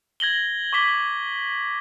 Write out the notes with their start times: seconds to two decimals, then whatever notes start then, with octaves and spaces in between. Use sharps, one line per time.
0.20 G#6 A#6 F#7 G7
0.73 C#6 D6 B6 G7